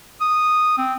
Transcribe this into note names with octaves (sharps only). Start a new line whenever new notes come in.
D#6
C4